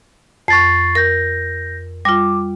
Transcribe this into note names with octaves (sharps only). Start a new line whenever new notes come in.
F2 C#6 A6 C7
A#4 G6 A#6
G3 F4 D6